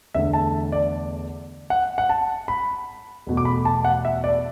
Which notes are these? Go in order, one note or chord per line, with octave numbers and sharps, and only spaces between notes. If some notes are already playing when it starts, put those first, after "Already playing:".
E2 D3 A3 E5
A5
D5
F#5
F#5
A5
B5
E2 B2 A3
D6
B5
A5
F#5
E5
D5